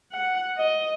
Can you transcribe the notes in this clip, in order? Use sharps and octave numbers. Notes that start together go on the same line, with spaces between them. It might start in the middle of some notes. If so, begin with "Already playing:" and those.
F#5
D#5